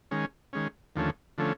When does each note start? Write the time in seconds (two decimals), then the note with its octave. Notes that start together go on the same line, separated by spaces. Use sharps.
0.11 D#3 G#3 C#4
0.53 D#3 G#3 C#4
0.96 D#2 D3 F3 A3 C#4
1.38 D3 F3 A3 C#4